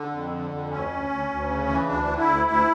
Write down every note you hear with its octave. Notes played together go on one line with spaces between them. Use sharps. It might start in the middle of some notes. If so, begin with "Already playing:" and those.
Already playing: D3
F2
D3
F2
D2 C#4
D2
D2
D2
C#3
E3
D2 D4
D3
E4
D2
D2 E4